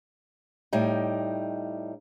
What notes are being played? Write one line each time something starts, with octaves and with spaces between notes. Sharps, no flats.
A2 G3 D#4